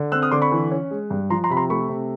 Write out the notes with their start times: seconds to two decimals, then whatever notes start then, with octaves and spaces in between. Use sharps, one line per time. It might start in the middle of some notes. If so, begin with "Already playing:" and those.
Already playing: D3
0.12 C4 E6 F#6
0.22 D#6 F6
0.31 D3 C6 D6
0.42 B5 C#6
0.52 E3
0.71 C#4
0.91 G#3
1.10 G2
1.30 F3 A#5 C6
1.44 A#5 C6
1.50 C3 B5
1.57 A#5 C6
1.70 A3 B5 C#6
1.89 C3